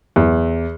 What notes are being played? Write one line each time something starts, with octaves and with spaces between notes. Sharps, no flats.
E2